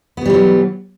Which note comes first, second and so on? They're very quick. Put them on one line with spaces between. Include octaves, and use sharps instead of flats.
B3 B2 G3 E3 F#3